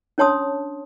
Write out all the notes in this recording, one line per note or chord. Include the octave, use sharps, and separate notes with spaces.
C#4 D4 C#5 A5 C6 D#6